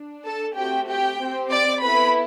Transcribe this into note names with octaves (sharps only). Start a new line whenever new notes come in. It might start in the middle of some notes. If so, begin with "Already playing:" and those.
Already playing: D4
A4 A5
A3 C4 F#4 G4 G5
G4 G5
C4 G4
D5 D6
B3 E4 A4 B4 B5